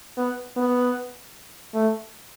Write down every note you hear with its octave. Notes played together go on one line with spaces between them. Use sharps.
B3
B3
A3